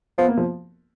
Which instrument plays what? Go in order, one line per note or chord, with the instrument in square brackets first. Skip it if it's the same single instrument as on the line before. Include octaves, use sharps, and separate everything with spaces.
[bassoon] F3 [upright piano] B3
[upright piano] A#3
F3